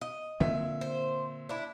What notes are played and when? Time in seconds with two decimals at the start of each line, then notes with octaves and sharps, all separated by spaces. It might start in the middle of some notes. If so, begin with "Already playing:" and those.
0.01 D#5
0.40 A#2 D3 C4 E5
0.81 C5
1.49 D4 E4